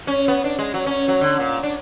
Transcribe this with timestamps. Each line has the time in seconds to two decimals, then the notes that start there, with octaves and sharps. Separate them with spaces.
0.07 C#4
0.28 B3
0.44 D4
0.59 G#3
0.74 F#3
0.86 C#4
1.08 F#3
1.21 D3
1.39 A#2
1.63 D4